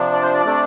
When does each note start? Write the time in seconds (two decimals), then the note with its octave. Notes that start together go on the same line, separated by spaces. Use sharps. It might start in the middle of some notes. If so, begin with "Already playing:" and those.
Already playing: C3 F3 D4
0.12 D5
0.22 C5
0.34 D5
0.45 C3 A3 D4